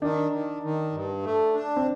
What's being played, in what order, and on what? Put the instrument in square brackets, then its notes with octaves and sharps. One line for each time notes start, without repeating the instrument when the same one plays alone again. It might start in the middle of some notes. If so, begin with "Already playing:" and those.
[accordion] D#3 [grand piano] D4
[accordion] D#3
D#3
G2
A3
D4
[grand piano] C4